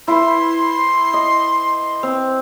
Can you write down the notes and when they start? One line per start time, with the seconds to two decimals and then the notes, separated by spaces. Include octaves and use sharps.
0.08 E4 B4 C6
1.14 D#5
2.03 C4